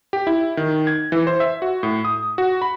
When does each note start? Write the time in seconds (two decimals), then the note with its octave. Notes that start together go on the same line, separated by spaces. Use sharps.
0.13 G4
0.27 E4
0.57 D#3
0.87 G#6
1.12 E3
1.27 C5
1.40 E5
1.62 F#4
1.83 A2
2.05 D#6
2.38 F#4
2.62 B5